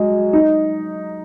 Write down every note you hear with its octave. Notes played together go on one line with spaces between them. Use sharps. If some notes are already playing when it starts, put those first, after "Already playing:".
Already playing: F#3 G#3
D#4